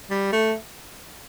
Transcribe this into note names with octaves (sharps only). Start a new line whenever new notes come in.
G3
A3